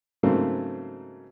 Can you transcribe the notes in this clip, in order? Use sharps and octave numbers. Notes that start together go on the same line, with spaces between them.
G#2 C#3 F#3 A3 A#3 C4